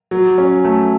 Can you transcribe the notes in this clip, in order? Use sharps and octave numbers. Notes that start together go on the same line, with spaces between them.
F#3
C#4
A3